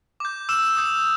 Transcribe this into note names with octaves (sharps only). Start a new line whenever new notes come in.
D6 G6
D6 E6 F6 E7
D#6 G6